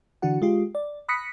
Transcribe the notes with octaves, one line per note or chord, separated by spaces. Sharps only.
D3 E3 D4 F#4 F#5
G#3 F4 G4
D5
B5 D#6 F#6 A#6 B6 C#7